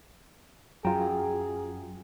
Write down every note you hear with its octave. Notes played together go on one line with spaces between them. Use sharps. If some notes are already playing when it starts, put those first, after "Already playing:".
F#2 F#3 F4 G#4 G5 A#5